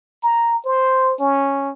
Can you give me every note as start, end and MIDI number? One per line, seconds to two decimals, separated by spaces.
0.23 0.59 82
0.65 1.14 72
1.20 1.71 61